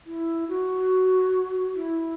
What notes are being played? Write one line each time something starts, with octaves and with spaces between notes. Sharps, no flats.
E4
F#4
E4